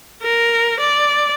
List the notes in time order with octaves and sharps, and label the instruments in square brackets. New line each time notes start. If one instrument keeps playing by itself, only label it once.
[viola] A#4
D5